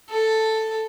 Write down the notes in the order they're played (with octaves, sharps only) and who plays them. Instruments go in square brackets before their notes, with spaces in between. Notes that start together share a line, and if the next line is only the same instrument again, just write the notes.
[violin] A4